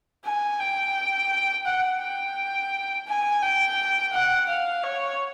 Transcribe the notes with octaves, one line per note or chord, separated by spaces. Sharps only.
G#5
G5
F#5
G5
G#5
G5
F#5
F5
C#5